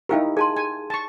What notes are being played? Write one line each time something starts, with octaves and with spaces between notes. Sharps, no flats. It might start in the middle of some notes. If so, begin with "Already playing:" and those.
D#4 E4 G4 A#4 F5 G5
G#4 G#5 A5 C6
G#5
A5 C#6